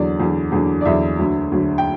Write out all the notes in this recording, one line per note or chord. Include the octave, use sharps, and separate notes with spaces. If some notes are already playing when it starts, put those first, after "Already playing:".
Already playing: E2 D3 F#3 D5
E2 D3 F#3
E2 D3 F#3
D5
E2 D3 F#3 E5
D2 D3 F#3
D2 D3 F#3
G5